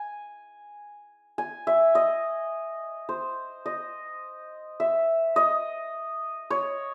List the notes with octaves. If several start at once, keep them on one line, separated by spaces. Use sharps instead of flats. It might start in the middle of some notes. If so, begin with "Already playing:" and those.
Already playing: G#5
G#5
E5
D#5
C5
D#5
E5
D#5
C#5